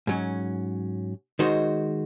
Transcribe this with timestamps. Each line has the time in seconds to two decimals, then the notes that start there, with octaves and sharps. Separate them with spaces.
0.07 G#2 F#3 C#4
1.39 D#3 G#3 D#4 F#4 C5